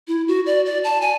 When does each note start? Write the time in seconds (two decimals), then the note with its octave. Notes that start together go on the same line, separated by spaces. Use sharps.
0.08 E4
0.28 F#4
0.46 D5
0.66 D5
0.84 A5
1.01 G#5